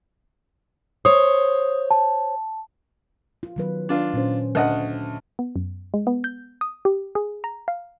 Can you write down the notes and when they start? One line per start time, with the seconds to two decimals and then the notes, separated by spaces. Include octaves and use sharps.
1.05 C5 C#5 D#6
1.91 A5
3.43 F4
3.56 D#3 F#3 B4
3.89 D4 F4
4.13 A#2 C#4 C5
4.55 D2 D#5 F#5
5.39 B3
5.56 F#2
5.94 G#3
6.07 B3
6.24 G6
6.61 D#6
6.85 G4
7.15 G#4
7.44 A#5
7.68 F5